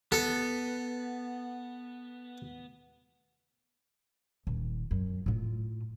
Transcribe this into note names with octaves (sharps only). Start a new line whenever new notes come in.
B3 A4
D#1
F#2
A2 F4